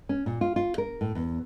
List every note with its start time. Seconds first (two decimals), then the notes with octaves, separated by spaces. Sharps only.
0.09 C#4
0.26 A#2
0.41 F4
0.56 F4
0.78 A#4
1.01 A2
1.15 E2